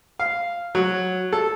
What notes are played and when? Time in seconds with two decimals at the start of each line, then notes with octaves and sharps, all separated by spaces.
0.19 F5
0.75 F#3
1.33 A4